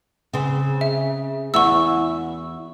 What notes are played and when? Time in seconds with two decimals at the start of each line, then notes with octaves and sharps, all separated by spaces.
0.33 C#3 C4
0.81 E5
1.54 E2 E4 F#4 C#6 E6